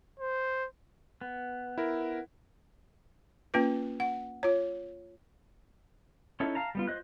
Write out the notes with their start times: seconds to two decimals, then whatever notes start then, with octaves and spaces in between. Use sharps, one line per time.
0.20 C5
1.21 B3
1.78 E4 A#4
3.54 A#3 C#4 F4 B4
4.00 F#5
4.43 F4 C#5
6.40 C#4 D#4 E4 A4
6.55 F5 A5 A#5
6.75 G3 B3 F4
6.87 F4 C5 D#5 F#6